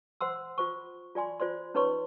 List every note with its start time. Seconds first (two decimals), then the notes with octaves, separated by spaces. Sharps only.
0.21 C5 F#5 C6 E6
0.58 F4 C5 C#6
1.15 F4 D5 G#5 C6
1.40 F4 C5 D5 C6
1.75 C#4 D#4 B4 C#5 C6 C#6